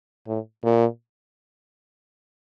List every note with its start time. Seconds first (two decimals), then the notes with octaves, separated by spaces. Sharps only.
0.27 A2
0.63 A#2